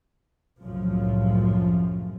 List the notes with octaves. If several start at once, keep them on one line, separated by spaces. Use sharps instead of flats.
C2 F#2 A2 C#3 F3 F#3